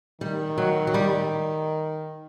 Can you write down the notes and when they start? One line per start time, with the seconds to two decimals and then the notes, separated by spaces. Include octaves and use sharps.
0.21 D#3 G3
0.58 F#3
0.87 F#3
0.94 G3